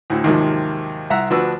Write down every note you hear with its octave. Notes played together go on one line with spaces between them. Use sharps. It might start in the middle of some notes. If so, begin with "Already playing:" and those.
D2 A2
D#2 G#2 C3 D#3 F3 F#3
C2 E5 F#5 A#5
D2 F3 D4 F#4 B4 E6